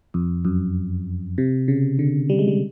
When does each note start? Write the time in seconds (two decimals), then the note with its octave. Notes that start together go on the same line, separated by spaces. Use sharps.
0.14 F2
0.45 F#2
1.38 C3
1.68 C#3
1.99 D3
2.29 G3
2.39 G#3
2.48 G3